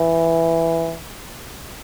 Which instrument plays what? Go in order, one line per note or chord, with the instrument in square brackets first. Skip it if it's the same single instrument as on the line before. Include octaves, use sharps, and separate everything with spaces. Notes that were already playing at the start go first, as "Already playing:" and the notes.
Already playing: [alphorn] E3